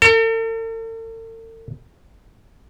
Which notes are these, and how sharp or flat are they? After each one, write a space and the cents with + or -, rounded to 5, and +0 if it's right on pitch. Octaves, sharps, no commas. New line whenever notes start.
A4 +45